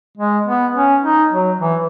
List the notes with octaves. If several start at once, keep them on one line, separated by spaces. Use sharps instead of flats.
G#3
B3
C#4
D#4
F#3
E3